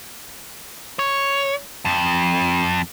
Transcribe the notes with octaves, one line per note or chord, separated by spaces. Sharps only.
C#5
F2